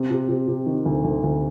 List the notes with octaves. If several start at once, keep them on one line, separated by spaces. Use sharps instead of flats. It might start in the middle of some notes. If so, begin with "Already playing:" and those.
Already playing: C3
C3
C3
C3
D#3
D2
D2
D2